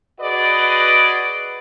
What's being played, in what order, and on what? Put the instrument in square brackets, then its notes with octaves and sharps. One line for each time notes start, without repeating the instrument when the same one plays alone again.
[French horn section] F#4 G#4 B4 D5 D#5